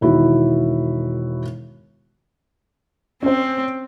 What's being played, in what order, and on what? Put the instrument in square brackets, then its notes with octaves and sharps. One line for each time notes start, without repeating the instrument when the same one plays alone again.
[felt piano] E1 D#3 E4 F#4
[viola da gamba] C4 [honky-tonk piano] C#4 C5